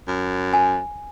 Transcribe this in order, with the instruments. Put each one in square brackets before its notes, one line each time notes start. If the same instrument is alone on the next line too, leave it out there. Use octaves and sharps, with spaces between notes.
[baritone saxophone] F#2
[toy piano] G#5